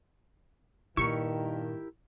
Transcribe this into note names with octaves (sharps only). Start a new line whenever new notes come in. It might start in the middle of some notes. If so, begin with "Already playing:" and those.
G2 A#2 D#3 E4 G4 A#4 C#6